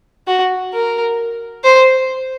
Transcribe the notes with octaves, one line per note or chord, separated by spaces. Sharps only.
F#4
A#4
C5